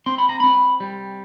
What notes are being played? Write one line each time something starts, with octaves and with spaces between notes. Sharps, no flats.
C4 C6
B5
A#5
C4 B5
G3